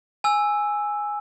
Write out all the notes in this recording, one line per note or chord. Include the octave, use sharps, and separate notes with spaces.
G#5 E6